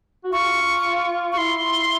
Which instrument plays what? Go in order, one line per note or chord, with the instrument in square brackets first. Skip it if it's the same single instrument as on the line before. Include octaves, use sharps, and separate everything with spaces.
[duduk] F#4
[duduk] F4 [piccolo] C#6
[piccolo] C#6
[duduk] E4 [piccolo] C6